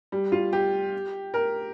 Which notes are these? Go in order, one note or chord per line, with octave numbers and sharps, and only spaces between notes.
G3
F4
G4
A#4